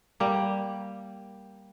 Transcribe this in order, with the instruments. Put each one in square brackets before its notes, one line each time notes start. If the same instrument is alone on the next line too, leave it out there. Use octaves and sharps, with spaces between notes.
[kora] G3 A#3